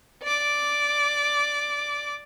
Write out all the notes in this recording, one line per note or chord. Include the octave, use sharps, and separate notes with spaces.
D5 D6